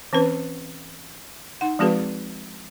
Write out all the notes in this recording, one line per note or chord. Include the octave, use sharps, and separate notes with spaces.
E3 C4 C#4 B4
D#4 F#5
F3 G#3 C4 F#4 G#4 B4